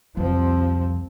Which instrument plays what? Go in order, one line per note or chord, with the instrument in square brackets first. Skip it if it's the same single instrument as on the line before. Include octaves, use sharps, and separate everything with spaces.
[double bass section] C2 F3 C4 [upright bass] F2